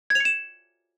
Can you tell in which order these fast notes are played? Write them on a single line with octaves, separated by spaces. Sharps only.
G#6 F7 C#7 E7